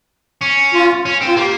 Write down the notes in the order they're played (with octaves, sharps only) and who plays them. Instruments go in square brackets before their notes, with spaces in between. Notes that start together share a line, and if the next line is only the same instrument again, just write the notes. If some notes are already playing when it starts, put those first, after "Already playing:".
[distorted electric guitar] C#4
[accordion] F4
[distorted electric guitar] C#4
C4
[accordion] F4
[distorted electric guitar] A#3 [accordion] G4